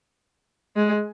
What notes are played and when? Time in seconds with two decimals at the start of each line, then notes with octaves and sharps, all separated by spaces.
0.76 G#3